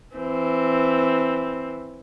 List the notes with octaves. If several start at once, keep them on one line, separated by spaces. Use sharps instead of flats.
E3 C4